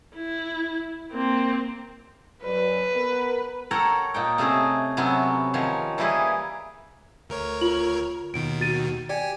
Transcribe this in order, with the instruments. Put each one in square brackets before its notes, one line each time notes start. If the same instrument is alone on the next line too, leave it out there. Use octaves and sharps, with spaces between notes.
[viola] E4
A#3 C4
[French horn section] F#2 F#3 D5 [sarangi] B4
[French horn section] B3 A#4
[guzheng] A4 A#4 C#5 F#5 G5 A#5
A#2 D#4 G5
C3 A3 C#4 G#4 A#5
C3 F#3 B3 C#4
D#3 F3 C#5
E3 G3 A#3 E4 G4 G#4
[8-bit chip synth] D2 A#4 C#5
[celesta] F4 F#7
[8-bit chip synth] D#2 B2 D#3 [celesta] D7
[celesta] F#4 A6 D#7
[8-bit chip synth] G4 G#5 [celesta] D5 G5